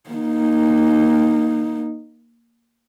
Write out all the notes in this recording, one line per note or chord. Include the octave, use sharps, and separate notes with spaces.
A#3 D#4